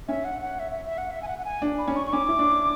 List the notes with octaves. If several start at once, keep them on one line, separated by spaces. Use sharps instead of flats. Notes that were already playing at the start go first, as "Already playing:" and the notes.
C#4 E5
F#5
F#5
E5
E5
E5
F#5
E5
G#5
F#5
F#5
G#5
D4
B5
C#4
C#6
C#6
C#4 D6
E4
D4